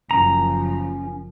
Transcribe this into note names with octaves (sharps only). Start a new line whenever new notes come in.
F#1 F3 C#4 A#5